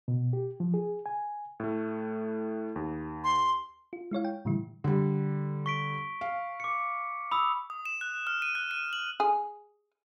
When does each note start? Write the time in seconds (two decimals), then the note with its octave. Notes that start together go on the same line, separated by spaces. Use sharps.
0.08 B2
0.33 G4
0.60 F3
0.74 G#4
1.06 G#5
1.60 A2 A3
2.76 D#2
3.24 C6
3.93 F4
4.11 G#3 E4 C#5 F5
4.25 G5
4.45 A2 D3 E3 G3 E4
4.84 D3 G3
5.66 C#6 B6 D7
6.21 F5
6.60 D6 C#7
7.32 B5 D#6 E6
7.70 D#6
7.85 E7
8.01 F#6
8.27 F6
8.42 D#7
8.55 F#6
8.71 D#7
8.93 F#7
9.20 G#4